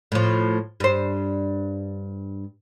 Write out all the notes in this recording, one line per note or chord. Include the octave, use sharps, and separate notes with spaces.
A2 F3
G2 C5